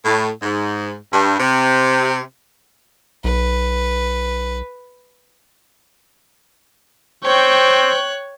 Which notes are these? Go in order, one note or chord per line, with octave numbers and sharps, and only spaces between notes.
A2
G#2
G2
C3
B1 B4
C4 C5 C#5 G5 C#6 F#6